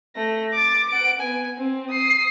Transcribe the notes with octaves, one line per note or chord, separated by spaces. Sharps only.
A3 A#6
D6 A6
F#5 D7
B3 G#5
C4
D#6 C7